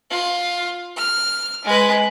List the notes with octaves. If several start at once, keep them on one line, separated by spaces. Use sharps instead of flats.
F4
F6
G#3 B4